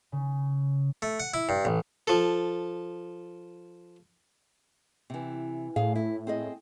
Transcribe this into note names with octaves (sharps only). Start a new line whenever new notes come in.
C#3
A3
F#5
E4
G2
A1
F3 A4
C3 E3
A2 G#4 F5
E4
C4 G#4 D#5